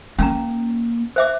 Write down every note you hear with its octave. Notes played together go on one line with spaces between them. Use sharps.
A#3 C#4 A#5
C5 E5 D6